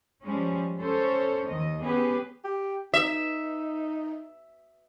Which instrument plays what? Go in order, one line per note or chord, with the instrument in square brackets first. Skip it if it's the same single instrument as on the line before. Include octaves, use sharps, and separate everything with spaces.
[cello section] F3 G3 G#3 C#4
C#4 A4 C5 C#5
D#2 D#3 D#5
B3 C#4 G4 G#4 B4
[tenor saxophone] G4
[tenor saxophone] D#4 [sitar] E5